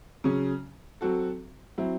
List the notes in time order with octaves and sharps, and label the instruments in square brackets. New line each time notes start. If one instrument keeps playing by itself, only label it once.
[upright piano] C#3 F#3 C#4
F#3 C4 F#4 A4
F#3 C4 E4